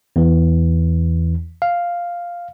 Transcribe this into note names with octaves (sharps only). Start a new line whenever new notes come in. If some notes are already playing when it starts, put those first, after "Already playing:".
E2 E3
F5